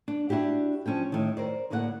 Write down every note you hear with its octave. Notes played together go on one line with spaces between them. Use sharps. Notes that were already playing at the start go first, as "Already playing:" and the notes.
D4
D4 E4 F#4 G4 D5
F3 C#4 D4 G5
A2 D#3
A#4 C5 D5
D2 A2 A#3 D5 F#5